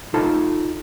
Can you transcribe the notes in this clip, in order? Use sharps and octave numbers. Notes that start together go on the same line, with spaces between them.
D#4 F4 A4 C5 A5